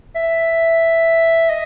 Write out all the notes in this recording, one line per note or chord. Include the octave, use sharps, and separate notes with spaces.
E5
D#5